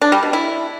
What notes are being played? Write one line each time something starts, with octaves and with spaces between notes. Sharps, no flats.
D4
G3
B2
E4